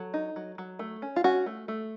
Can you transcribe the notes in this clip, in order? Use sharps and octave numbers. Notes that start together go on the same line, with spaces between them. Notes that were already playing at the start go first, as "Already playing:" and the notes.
Already playing: F#3 A4
D#4
F#3
F#3
A3
C#4
F4
C#4 F#4
A3
A3